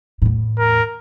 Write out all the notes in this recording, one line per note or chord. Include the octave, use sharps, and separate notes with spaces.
E2 A2
A#4